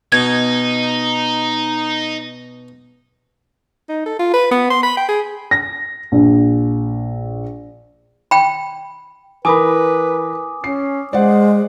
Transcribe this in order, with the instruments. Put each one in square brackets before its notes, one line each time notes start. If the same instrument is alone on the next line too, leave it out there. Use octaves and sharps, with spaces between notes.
[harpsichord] B2 [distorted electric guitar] D#4 [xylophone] G#6
[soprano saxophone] D#4
A4
F4
B4
B3
C6
B5
G5
G#4
[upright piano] A#6
A#1
[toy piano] G5 B5
[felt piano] E3 A#4 B5 [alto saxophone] B4 [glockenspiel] G#5 D6 D#6
[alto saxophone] C#4 [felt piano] C7
[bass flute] G#3 [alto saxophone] C5 [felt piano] D5 F#5